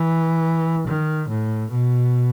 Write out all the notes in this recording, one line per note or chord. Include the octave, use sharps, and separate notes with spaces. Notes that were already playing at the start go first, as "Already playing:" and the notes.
Already playing: E3
D#3
A2
B2